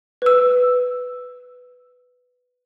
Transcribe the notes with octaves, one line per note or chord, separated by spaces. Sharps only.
B4 E6